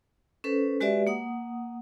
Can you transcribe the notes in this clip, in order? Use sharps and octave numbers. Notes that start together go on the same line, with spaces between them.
C#4 A4 B4 C5
G#3 F#4 G4 B4 D5 E5
A#3 F#5 D#6